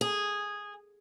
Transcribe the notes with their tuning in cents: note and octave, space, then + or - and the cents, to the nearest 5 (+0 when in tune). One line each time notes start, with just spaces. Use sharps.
G#4 -10